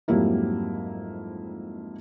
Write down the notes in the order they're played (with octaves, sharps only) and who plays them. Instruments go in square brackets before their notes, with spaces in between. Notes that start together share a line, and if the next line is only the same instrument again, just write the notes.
[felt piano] F2 G#2 F#3 G3 A#3 E4